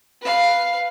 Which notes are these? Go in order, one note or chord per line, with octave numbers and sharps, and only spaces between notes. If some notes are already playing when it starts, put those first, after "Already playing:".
B4 F5